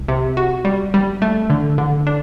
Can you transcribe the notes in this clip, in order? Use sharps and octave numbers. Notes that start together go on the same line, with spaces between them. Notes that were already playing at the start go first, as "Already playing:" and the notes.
Already playing: C2
C3
F#4
G3
G3
A3
D3
D3
D4